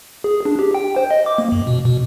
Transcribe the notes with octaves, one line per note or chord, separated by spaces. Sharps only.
G#4
D4
G4
G5
C5
D#5
D6
A#3
F#2
B2
B2